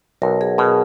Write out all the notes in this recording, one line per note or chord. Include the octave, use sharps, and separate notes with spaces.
B1 A#4
G#4
B2 G#4